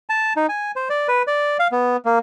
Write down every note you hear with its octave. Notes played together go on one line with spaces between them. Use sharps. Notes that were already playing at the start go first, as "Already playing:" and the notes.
A5
D#4
G#5
C5
D5
B4
D5
F5
B3
A#3